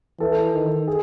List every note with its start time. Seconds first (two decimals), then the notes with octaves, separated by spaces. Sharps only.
0.20 E3 A4
0.54 D#3
0.88 G#4